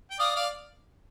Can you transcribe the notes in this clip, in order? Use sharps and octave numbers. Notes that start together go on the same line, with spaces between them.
G5
D5 F5 D#6
D5 F5